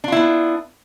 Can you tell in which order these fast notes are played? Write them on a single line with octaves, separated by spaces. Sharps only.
D4 F4 E4 B3